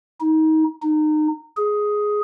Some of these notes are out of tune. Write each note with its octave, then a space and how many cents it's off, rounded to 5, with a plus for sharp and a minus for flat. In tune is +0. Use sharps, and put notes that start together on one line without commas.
D#4 +25
D#4 -25
G#4 +5